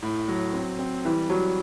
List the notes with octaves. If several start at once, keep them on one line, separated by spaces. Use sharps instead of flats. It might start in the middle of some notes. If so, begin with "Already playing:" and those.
A2
F#3
C4
C4
E3 G3
F#3 G3